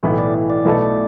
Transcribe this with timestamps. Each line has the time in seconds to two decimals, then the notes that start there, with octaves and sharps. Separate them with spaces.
0.03 B1 A2 E3 B3 E4
0.18 D5
0.50 D5
0.65 B1 B2 A3 E4 A4